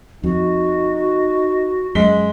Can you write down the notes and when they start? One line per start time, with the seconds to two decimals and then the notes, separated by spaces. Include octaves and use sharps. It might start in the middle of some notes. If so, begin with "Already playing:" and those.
0.24 F2 D#4 F#4
1.95 F#2 G#3 B6 G7